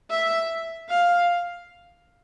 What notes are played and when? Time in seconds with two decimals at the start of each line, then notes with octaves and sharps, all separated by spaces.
0.10 E5
0.90 F5